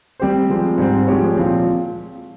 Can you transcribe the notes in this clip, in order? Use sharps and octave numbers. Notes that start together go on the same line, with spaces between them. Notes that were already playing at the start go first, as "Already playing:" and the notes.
G3 C4 G4 C5
F3 G#3 C4
G#2 G3 C4
F3 G#3 C4 G4 C#5
A#2 F3 C4